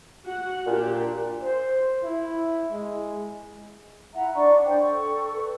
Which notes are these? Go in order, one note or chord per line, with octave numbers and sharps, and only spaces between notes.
F#4 F#5
A#2 D4 G4
C5
E4
G#3
E4 E5 F#5 A#5
D4 D5 C#6
C5 G5
A4 C#6
B4